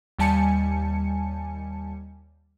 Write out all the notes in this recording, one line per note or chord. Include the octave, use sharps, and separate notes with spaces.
D#2 G3 G#5 A5 C#7